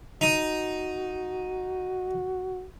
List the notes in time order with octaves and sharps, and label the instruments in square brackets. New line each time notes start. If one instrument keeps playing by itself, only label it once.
[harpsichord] D#4 D#6 [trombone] F#4